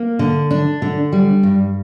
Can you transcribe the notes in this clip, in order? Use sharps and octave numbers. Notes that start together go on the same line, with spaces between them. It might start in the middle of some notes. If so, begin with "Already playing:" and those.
Already playing: A#3
D3
D4
D3
G3
G2